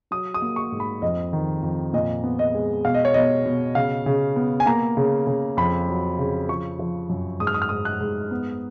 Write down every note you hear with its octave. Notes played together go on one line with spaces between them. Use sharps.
F#3 D#6
D#6
A#3
C#6
G#2
B5
F2 D#5
D#3
F2
A#2 D#5
B3
D#5
G#3
B2 F5
D#5
C#5
B2 D#5
B2
C#3 F5
C#3
B3
G#5
A#3 A#5
C#3
C#3
F2 B5
F#3
C#3
F3 C#6
F3
F#2
G#2 D#6
F6
D#6
F6
G#2 D#6
F#6
G#2
B3